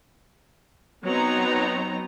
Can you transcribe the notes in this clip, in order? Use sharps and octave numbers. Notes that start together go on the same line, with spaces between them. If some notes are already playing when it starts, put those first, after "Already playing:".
F#3 B3 C4 D#4 A#5